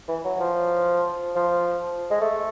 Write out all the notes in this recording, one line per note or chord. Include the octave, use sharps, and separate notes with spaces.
E3
F#3
F3
F3
G#3
A3